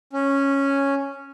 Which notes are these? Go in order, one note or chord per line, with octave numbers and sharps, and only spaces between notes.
C#4